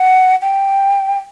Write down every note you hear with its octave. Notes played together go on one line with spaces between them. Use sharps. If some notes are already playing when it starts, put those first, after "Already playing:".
Already playing: F#5
G5